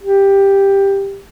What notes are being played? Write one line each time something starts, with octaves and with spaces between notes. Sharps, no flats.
G4